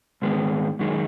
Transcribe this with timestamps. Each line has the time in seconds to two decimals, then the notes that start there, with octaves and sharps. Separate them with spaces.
0.22 G#2 D#3 G#3 B3
0.79 F#2 D#3 G#3